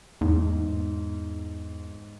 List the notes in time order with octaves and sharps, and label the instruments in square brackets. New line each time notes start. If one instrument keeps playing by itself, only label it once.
[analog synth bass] E2 [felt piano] G#2